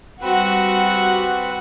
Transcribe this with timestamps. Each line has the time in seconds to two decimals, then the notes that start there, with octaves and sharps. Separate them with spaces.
0.21 G3 C4 F#4 B4